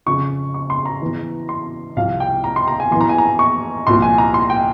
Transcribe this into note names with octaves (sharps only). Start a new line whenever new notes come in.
F2 C#3 F3 C#6
C#6
C6
A#5
E2 E3
C6
C2 C3 F3 F5
G5
A#5
C6
A#5
G#5
E2 E3 C6
A#5
G#5
A#5
C#6
C2 A#2 F3 C6
G#5
A#5
C6
G5